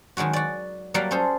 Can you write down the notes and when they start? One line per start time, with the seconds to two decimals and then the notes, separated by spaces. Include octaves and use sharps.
0.17 D#3 F#3 G#3 F#4
0.33 F#4 D5
0.94 F#3 G3 A#3 F#4 D5 F5
1.11 C#4 G#4 A4 C5